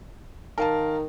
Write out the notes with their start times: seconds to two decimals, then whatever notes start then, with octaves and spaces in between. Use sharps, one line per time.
0.58 D#3 A#4 F5 A5